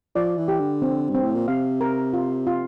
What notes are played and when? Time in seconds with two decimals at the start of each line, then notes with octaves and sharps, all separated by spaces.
0.15 F3 D5
0.37 E3
0.48 G4
0.60 D3
0.82 C4
1.10 G2 C4
1.23 A2
1.35 A#2
1.48 C3 F5
1.81 A#4
2.14 F4
2.47 F4